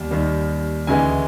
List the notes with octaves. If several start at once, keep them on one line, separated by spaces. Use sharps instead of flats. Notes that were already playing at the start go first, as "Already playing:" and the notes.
Already playing: D#2 G3
D#2 D#3 G3
D2 C#3 E3 G#3 G#5